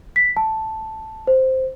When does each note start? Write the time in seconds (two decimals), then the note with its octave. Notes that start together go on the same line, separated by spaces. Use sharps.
0.16 B6
0.37 A5
1.27 C5